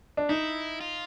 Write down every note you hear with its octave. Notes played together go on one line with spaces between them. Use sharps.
D4
D#4 E4
F4